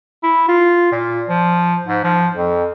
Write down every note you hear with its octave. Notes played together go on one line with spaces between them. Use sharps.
E4
F4
A#2
F3
G#2
F3
F2